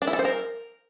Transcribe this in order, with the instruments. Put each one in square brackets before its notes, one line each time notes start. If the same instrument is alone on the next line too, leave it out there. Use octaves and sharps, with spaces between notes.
[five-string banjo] D4
E4
A4
C5
A#4